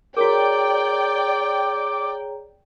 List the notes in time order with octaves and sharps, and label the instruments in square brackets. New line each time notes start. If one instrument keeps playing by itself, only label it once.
[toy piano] F#4 A#4 [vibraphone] G#4 C#5 A#5 [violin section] D5 G5 [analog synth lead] D6